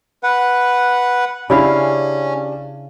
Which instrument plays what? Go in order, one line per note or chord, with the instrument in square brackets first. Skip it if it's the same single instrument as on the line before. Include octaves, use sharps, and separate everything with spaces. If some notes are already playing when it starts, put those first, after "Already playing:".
[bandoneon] B4 F#5
[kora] C#3 E4 F5 [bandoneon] C#4 [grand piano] D4 G4